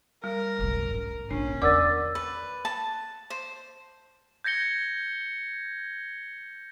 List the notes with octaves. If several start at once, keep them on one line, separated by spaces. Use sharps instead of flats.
G3 A#4
F1 B1
G#2 C#4
A#1 C#4 D4 E4
E2 D#3 A#4 D5 F#5 D6 E6 A6
B4
A5
C5
G6 G#6 A#6 C#7 G7